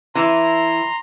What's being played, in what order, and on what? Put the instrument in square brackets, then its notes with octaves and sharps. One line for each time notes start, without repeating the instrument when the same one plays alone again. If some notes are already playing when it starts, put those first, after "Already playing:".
[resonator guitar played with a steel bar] E3 E4 [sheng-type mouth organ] A#5 C6